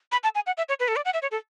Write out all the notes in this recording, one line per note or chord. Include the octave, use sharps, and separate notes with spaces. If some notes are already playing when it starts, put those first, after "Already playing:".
B5
A5
G#5
F#5
E5
C#5
B4
A4
D5
F#5
E5
C#5
A4